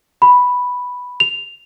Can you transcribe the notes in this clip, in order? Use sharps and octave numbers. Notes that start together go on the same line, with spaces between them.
B5
F7